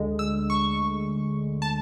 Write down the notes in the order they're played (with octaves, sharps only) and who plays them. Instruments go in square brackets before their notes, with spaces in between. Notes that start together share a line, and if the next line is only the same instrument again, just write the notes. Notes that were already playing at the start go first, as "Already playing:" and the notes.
Already playing: [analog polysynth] D2 D3 G#3
E6
C#6
A5